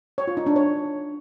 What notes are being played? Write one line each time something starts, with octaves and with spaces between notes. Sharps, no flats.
C#5
F4
D#4
D4
C#5